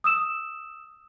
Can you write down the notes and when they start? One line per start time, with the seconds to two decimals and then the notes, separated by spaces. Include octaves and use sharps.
0.04 D#6 E6 E7